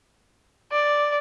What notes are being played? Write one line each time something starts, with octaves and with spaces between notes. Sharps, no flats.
D5